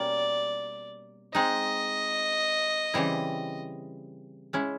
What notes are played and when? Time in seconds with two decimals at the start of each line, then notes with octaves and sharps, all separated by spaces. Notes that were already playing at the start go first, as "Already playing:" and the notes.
Already playing: B2 G3 A#3 C#4 D5
1.34 G#3 C4 D#4 D#5
2.94 C#3 E3 G3 C4 E4
4.53 G#3 C#4 E4